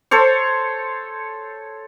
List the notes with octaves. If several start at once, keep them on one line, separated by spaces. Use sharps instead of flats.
A4 C5 C#5